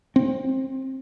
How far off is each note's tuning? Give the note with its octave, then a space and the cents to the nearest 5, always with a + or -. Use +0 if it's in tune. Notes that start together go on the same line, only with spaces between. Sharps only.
C4 +20